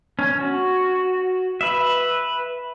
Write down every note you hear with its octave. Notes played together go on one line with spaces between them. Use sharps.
C#4
F#4
B4 E5